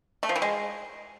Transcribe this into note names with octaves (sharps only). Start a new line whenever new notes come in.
A3
F3
E3
G#3